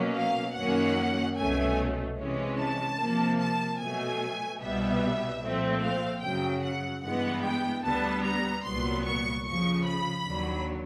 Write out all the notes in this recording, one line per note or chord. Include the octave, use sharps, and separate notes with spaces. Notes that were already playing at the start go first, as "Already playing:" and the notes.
Already playing: B2 F#3 A#3 C#4
F5
F#2 D#3 F#3 A#3 C#4 F#5
C2 B2 F#3 A3 C#4 G#5
C3 E3 G#3 C#4
A5
C3 F3 A#3
A5
B2 F#3 A3 G#5
C2 B2 G3 B3 E5
A#2 F3 A3 C4
F5
F#2 C#3 F#3 G5
F#5
G2 E3 G#3 B3 F#5
G5
D2 D3 G3 B3 A5
A#5
C2 A#2 F#3 B3 C6
C#6
F2 C#3 F3 C#6
B5
D#2 D3 F#3